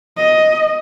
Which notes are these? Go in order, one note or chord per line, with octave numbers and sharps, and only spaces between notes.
D#5